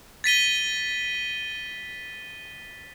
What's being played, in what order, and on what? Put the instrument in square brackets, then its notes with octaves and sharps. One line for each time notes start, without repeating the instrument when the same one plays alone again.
[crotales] A6 B6 D#7 G7